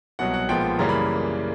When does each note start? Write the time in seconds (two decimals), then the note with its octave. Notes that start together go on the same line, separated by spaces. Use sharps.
0.19 C2 B2 F#3 F#5
0.34 F#5
0.49 B1 A#2 F3 G#3 B3 G5
0.79 F#2 C#3 E3 G3 A#3 A#5
0.89 B5